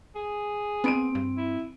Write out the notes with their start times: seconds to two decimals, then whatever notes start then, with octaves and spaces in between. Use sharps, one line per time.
0.15 G#4
0.84 B3 C4 D7 D#7
1.15 G2
1.37 E4